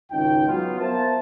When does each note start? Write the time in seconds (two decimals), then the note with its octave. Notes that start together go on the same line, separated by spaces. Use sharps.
0.12 G#1 C#2 C#3 C#4 D#4 G5
0.48 F#3 B3 F4
0.80 B3 A#4 C5 E5 A5